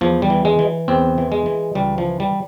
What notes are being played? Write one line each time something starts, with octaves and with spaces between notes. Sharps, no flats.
E2 F3
G3
E3
G#3
E3
E2 C4
E3
G#3
E3
C#2 G3
F3
E3
G3